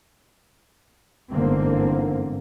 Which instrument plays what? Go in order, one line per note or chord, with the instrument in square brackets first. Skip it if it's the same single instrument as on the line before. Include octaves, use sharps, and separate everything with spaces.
[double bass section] G1 E2 G#2 D3 A#3 C4